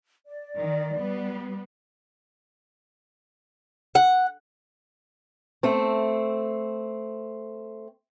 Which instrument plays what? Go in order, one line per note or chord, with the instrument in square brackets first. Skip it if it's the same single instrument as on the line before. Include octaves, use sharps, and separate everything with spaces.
[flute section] D5
[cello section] D#3
G3 B3
[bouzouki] F#5
[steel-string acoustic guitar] A3 C4